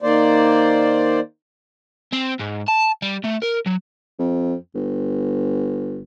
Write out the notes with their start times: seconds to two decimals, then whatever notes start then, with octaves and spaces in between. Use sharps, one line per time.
0.02 D#3 A#3 C5 D5
2.13 C4
2.40 G#2
2.68 A5
3.02 G3
3.24 A3
3.42 A#4
3.66 F#3
4.19 F2
4.75 G1